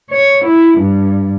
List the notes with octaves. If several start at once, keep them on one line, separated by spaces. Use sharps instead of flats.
C#5
E4
G2